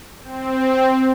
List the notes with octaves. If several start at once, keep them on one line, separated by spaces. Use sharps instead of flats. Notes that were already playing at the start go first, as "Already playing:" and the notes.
C4